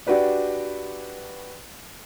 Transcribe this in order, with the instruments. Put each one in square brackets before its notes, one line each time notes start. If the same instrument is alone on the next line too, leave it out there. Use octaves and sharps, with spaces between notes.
[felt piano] D4 F#4 G4 B4 D5